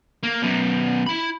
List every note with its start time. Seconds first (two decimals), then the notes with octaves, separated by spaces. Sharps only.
0.23 A#3
0.42 F#2 B2
1.06 E4 B5